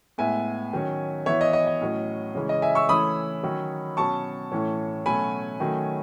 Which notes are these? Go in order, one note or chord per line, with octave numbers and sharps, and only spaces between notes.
A2 G#3 B3 E5 G#5
D#3 F#3 C#4
E3 B3 C#5 E5
D#5
D#5
D#5
A2 F#3 C#4
C#3 E3 G#3 C#4
D#5
E5 G#5
C#6 E6
E3 A3 C#4 B5 D#6
D#3 F#3 C#4
B2 F#3 C#4 A5 C#6
A2 E3 A3 C#4
B2 F#3 A3 C#4 G#5 B5
D#3 F#3 A3 C#4